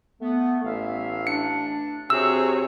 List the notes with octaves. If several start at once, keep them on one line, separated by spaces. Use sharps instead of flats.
A3 B3
A1 E5 F5
D4 C#7
C3 F#4 G#4 C5 C#5 E6